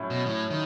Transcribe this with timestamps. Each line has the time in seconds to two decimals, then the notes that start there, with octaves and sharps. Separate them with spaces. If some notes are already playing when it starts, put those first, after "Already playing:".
Already playing: A2 F#3 C#4 E4
0.10 B2
0.26 A2
0.50 D#3